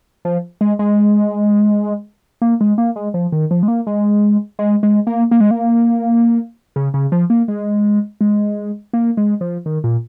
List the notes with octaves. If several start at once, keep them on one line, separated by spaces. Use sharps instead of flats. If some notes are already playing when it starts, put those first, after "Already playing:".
F3
G#3
G#3
A#3
G#3
A#3
G#3
F3
D#3
F3
G#3
A#3
G#3
G#3
G#3
A#3
A#3
G#3
A#3
C#3
C#3
F3
A#3
G#3
G#3
A#3
G#3
F3
D#3
A#2